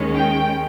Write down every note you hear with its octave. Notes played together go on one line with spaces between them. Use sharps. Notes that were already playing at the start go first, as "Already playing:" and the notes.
Already playing: D#2 D#3 G#3 C#4
G5